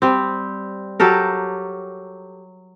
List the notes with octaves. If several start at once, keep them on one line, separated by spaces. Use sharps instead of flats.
G3 C4
F#3 G4 A4 A#4